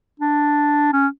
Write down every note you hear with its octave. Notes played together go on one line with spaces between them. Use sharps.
D4
C#4